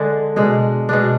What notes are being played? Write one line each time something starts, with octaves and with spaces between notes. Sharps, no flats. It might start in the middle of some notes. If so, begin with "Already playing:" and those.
Already playing: D3 G#3 D4 G#4
B2 G#3 D4
B2 G#3 D4